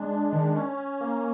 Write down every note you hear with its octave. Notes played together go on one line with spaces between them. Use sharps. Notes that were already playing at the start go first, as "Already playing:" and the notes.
Already playing: G#3 D4
D4
D#3
C#4
C#4
A#3